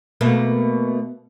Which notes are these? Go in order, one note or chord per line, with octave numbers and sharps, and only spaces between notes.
B2 A3 A#3